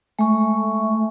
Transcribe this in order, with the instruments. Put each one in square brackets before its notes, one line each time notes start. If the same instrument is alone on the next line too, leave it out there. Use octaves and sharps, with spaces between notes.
[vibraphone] G#3 C#6 [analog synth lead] A3